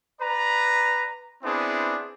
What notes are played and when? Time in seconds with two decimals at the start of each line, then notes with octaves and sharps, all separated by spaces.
0.21 B4 D5 A#5
1.43 B3 C4 D4 E4 G#4